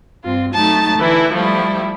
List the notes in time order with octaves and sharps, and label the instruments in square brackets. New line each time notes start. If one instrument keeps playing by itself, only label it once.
[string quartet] G2 C4 F4
F#3 A3 D#4 A5 A6
D3 E3 E4
F3 G3 A3 E4